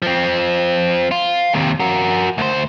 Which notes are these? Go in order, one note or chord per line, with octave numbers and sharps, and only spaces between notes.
F3 C4
F4
D#2 C3
F#4 A#4
D2 C5